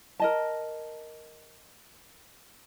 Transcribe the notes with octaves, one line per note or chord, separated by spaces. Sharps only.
A#4 D#5 A5